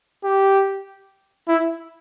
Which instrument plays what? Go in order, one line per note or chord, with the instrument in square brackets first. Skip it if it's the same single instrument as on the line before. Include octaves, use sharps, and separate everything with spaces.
[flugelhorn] G4
E4